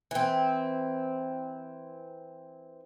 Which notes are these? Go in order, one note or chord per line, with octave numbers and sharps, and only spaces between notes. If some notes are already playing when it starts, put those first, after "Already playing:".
E3 C4